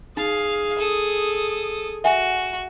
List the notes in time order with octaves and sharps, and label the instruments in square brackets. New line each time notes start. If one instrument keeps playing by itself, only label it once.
[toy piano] D#4 [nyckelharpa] G#4 [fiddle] F5
[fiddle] A4 D#6
[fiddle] F#4 [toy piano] E5 F#5 G#5